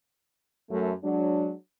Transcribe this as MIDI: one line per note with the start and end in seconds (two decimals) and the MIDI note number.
0.70 0.92 42
0.70 0.92 57
1.03 1.52 54
1.03 1.52 56
1.03 1.52 62